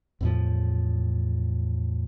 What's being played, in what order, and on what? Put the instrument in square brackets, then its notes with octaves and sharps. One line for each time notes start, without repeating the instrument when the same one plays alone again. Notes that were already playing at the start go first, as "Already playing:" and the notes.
[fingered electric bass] E2 A2 F3